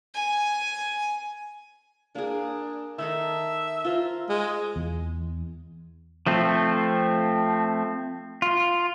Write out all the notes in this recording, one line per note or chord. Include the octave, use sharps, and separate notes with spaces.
G#5
A#3 D4 G#4
D#3 D#4 A4 E5
F4 C5 A#5
G#3
E2
F3 A3 C4
F4